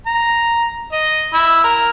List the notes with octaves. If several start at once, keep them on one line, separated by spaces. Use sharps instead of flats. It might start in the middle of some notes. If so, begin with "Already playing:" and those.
A#5
D#5
E4
A#4